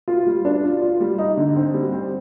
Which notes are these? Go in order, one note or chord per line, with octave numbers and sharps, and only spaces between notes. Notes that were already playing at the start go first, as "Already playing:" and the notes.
F4
G3
D4
F4
F4
G3
D#4
D3
C4
G3
C4